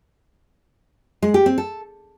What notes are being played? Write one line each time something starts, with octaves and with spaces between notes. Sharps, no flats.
G#3
G4
C4
A4